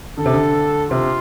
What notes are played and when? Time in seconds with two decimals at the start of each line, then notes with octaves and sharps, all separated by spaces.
0.18 D3 A4
0.26 C3
0.34 D3
0.90 C3 F4